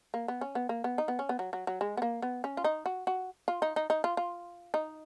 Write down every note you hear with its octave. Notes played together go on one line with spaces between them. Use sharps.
A#3
B3
C#4
B3
A#3
B3
D#4
B3
C#4
B3
F#3
F#3
F#3
G#3
B3
A#3
B3
C#4
F4
D#4
F#4
F#4
F4
D#4
D#4
D#4
F4
F4
D#4